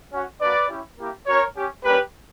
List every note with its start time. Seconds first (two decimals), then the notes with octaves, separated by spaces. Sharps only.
0.12 C#4 F#4
0.41 A#3 D4 F#4 B4 D5
0.69 C#4 E4 G4
0.98 A#3 E4 G4
1.26 C#4 F#4 A#4 C#5
1.56 C#4 G4
1.84 G3 A#3 C#4 G4 B4